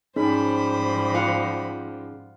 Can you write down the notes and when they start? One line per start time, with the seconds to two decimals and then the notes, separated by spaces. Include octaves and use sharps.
0.16 G#2 F3 G3 C#4 D#4 G#4 C5 B5
1.14 F4 F5 F#5